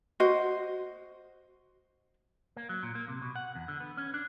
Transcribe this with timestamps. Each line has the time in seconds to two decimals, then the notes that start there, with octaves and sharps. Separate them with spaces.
0.20 F#4 C5 D#5
2.57 A#3
2.69 F#3
2.83 A#2
2.95 A#3
3.08 C3
3.22 B2
3.36 F#5
3.55 E2
3.68 D3
3.80 B3
3.97 C#4
4.14 D4